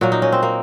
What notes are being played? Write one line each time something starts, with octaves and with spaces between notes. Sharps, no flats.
A#2 F#3 A#3 F#4
D#4
C#4
C4
A#3